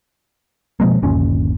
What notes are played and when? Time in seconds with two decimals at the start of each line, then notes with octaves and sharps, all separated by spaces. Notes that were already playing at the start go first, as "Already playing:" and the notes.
0.80 B2 F3 G#3 A#3
1.03 G1 D#2 A#2 C#4